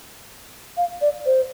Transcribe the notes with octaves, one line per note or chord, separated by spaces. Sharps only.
F5
D5
C5